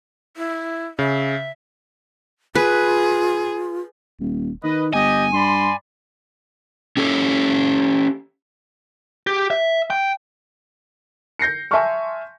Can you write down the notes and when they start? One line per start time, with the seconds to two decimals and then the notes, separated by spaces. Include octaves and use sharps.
0.37 E4
0.99 C#3 E5
2.55 F4 G#4 B4
4.20 D#1
4.64 D#3 B4 D#5
4.93 G1 G4 D#5 G#5
5.33 G2 D5 B5 C6
6.97 C#4 G4 A4
9.27 G4
9.50 E5
9.90 G5
11.39 G6 A#6 C7 C#7
11.71 E5 G#5 A5 C6 C#6 F6